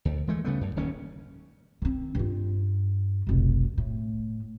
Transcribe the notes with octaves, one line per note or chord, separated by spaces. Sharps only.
D2
E3 G#3 A3
C#3 G3 A3 B3
F#2
D1 D#2 C#4
D#3 C4
G2 F4
F1 B1
A2